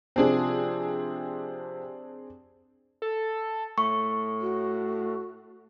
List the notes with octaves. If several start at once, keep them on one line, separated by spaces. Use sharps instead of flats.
C3 F3 C4 D4 G#4
A4
A2 C#6
F#4